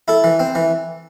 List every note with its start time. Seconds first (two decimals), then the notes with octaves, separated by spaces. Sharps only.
0.08 E4 A4
0.24 E3
0.40 C4
0.55 E3